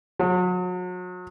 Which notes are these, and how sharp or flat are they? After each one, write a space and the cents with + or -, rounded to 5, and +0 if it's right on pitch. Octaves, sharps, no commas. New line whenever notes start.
F#3 -35